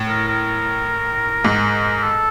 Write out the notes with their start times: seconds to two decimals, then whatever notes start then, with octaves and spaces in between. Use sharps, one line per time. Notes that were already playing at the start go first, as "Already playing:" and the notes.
Already playing: A2
0.08 A#4
0.28 A#4
1.45 G#2
2.02 A4